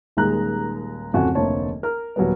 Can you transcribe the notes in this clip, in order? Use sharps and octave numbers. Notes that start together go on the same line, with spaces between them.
D#1 D#2 G#3 G#4 A#5 F#6
D1 F2 C#3 F#4 A4 G#5
F1 D2 A#3 C4 C#5 A5
A#4 F6
D#1 F#3 G3 B3